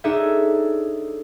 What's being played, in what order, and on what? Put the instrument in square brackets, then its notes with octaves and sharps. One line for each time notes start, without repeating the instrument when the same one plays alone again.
[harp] D4 D#4 G#4 A4 C#5 E5